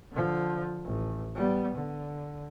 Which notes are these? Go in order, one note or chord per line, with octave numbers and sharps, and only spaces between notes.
D3 F3
A1
G3 B3
D3